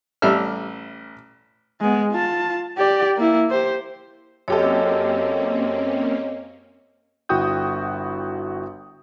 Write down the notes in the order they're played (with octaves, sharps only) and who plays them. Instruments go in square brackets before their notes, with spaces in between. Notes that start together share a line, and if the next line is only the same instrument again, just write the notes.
[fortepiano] A1 G3 E5 F6
[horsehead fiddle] G#3 B3
F4 A5
G4 D5
A#3 E4
G4 C5
[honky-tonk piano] F#2 G4 A4 [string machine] A#3 C4 C#4 [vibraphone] C#5 D#5
[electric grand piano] G1 E4 F#4 G5 D#6 G6